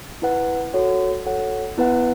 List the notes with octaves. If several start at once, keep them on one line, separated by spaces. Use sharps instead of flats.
E4 B4 F#5
F#4 A4 C#5 F#5
F#4 A4 C#5 F#5
B3 E4 B4 F#5